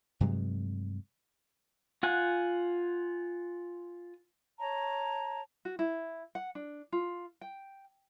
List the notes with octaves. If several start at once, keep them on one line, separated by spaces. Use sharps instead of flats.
G2 C3 F#3 G#3
F4 F#5 G#5
C#5 A5 A#5
F#4
E4
F#5
D4
F4
G5